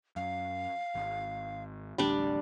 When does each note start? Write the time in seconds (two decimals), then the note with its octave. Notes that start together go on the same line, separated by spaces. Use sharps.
0.16 F#2 F5
0.95 G#1
1.98 A1 D2 G3 D4